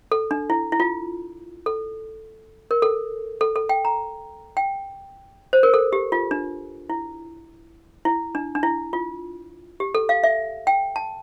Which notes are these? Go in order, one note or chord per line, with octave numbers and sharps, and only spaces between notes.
A4
D4
E4
E4
F4
A4
A#4
A4
A4
A4
G5
A#5
G5
C5
A#4
A4
G4
F4
D4
E4
E4
D4
D4
E4
F4
G4
A4
F5
E5
G5
A5